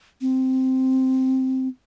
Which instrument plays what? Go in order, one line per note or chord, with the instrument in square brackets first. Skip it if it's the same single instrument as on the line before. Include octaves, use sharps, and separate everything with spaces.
[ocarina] C4